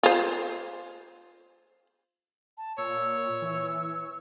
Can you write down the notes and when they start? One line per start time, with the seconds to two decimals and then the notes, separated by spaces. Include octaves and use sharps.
0.03 F4 C5
2.58 A5
2.78 A#2 C#5 E6
3.42 E3